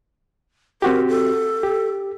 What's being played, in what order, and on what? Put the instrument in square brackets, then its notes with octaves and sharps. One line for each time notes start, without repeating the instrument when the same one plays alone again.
[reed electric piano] C4 F#4 G4 [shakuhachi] A#4
[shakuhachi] A4
[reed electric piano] G4